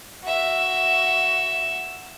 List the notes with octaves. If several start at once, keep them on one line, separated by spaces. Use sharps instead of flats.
F#4 E5